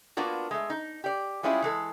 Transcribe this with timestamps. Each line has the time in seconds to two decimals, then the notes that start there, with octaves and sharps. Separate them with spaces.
0.17 A#3 B3 D4 F4 F#4
0.51 G#3 A3
0.70 D#4
1.04 G4 D5
1.43 G3 G#3 C#4 E4 F4 G#4
1.62 E3 G#3 A4